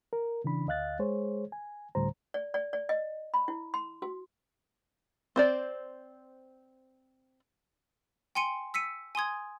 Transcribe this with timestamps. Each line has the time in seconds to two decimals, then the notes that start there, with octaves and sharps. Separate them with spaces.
0.13 A#4
0.44 C#3 E3 D4 B5
0.67 D2 D#5 F5 F#6 A6
0.99 G#3 G#4 C5 C#5
1.52 G#5
1.95 D2 A2 D3 G3 C5 A#5
2.34 D5
2.54 D5
2.73 D5
2.89 D#5
3.34 B5
3.48 E4
3.74 C6
4.02 F#4
5.36 C4 C5 D5
8.35 G5 G#5 C6 C#7 D#7
8.74 E6 B6 C#7 D#7
9.15 G#5 C6 D#6 G#6